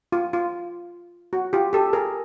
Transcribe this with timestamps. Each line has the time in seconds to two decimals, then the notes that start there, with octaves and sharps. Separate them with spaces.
0.12 F4
0.33 F4
1.33 F#4
1.53 F4 G4
1.73 G4 A4
1.93 G#4 A#4